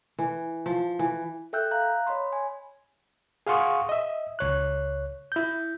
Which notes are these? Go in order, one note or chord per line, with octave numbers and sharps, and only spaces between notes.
E3
F3
E3
A4 E5 G5 E6 F#6 G6
F5 A#5 F#6
C#5 D#5 B5 C6
G#5
G#4 F5 F#5 C6 C#6 D#6
D#5 E5
C#2 C#5 F#6
E4 G6